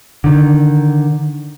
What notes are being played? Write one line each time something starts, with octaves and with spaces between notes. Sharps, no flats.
D3 D#3